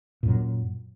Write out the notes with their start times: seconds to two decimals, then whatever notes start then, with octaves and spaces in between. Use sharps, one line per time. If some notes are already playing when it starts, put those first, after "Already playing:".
0.23 A#2
0.25 F#2
0.28 F#3